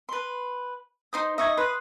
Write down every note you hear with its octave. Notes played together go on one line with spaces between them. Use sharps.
B4 C6
D#4 C5 D#6
D#4 D#5 E5 C#6 G#6
B4 C6 D#6 F#6